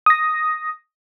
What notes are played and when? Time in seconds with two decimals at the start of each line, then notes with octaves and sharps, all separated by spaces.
0.06 D#6 A#6